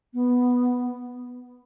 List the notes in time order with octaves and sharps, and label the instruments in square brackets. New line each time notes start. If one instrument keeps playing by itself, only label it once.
[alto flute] B3